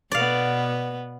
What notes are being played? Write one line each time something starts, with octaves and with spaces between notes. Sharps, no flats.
B2 B3 D5 F5